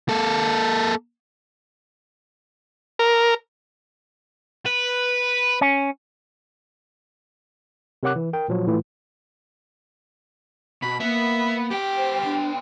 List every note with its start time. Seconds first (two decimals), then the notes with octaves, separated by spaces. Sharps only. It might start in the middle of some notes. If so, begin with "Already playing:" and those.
0.09 A#3 A4
2.99 A#4
4.66 B4
5.61 C#4
8.03 C3 A#4 C#5 F#5 D6 F#6
8.16 E3
8.33 A#4 G5
8.48 A#2 F3 F#3
8.67 A2 E3 A3 E4 F4
10.82 B2 B5
11.00 A#3 B3 E5
11.71 B3 G4 G5
11.97 C5
12.24 D4